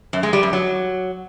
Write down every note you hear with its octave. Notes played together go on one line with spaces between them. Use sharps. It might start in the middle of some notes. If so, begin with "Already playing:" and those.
F#2
G#3
G3
F#2
F#3